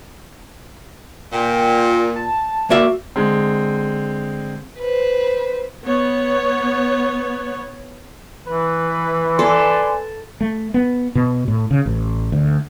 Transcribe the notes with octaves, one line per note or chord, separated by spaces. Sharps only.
A#2 G5
A5
A#3 F#4 D5 E5
D3 G#3 C4
B4 C5
B3 C#5
E3 B4
A4 D5 G#5 C6
A3
B3
B2
A2
C#3
A1
D2